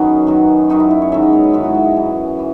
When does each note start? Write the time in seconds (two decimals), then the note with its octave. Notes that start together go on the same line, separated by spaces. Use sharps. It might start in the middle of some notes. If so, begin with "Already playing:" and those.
Already playing: F#2 D#3 F#3 B3 C#4 G#4 B4
0.27 F#2 D#3 F#3
0.69 F#2 D#3 F#3 D#4
0.80 E4
0.91 E4
1.02 C#5
1.12 G#2 D#3 F#3 E5
1.23 D#5
1.33 C#5
1.44 B4
1.53 G#2 D#3 F#3 E4
1.64 F#4
1.75 E5
1.85 D#5
1.96 F#2 E3
2.39 E3